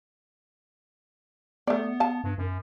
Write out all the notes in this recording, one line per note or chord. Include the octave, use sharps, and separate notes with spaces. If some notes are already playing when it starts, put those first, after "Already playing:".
A3 B3 D5
F5 A5
G2
F#2